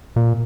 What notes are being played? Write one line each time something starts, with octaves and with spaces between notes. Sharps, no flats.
A#2